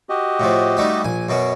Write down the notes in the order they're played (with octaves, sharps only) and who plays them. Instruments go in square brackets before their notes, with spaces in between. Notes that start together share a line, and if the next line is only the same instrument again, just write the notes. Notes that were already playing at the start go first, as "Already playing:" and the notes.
[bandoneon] F#4 G4 D#5
[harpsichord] A2 F3
G3 A3 D#4
A#1 G#5
F#2 B2 C#4